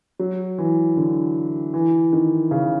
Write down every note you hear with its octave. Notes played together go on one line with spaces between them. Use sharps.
F#3
E3
D3
E3
D#3
C#3